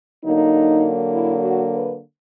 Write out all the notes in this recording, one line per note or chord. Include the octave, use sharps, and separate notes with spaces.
D3 F#3 A#3 D#4
E4
F#4
B4